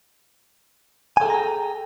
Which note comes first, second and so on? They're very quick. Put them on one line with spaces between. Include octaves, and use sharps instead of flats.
G#5 A4 G#4 A#5 G5